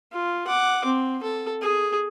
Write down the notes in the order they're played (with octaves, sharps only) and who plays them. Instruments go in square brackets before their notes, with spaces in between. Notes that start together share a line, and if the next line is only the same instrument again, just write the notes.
[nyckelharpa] F4
F#5 D6
C4
A4
G#4